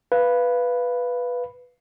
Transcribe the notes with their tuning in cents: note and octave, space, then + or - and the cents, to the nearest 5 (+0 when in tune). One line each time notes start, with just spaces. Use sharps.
B4 +0 F5 -10